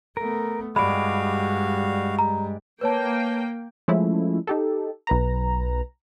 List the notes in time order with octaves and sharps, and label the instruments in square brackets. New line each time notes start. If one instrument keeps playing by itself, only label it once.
[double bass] A3 B3 [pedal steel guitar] A#4
[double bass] G2 G3 [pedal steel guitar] G#3 D5 [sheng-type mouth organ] F#4 F5 [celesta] B5
[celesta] A#5
[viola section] A#3 G5 [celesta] B4 C#5 A5
[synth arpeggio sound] F3 G#3 A3 C#4 E4
D#4 G4 A4
B1 B4 A#5